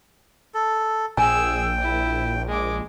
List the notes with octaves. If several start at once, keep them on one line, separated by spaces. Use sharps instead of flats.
A4
A#1 G#4 G5 G#5 E6
E4
G#3 D6